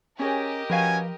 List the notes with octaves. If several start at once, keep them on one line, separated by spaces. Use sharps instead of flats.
C#4 G4 G#4 A#4 C#5 D#5
F3 C#4 F#4 B4 F5 G#5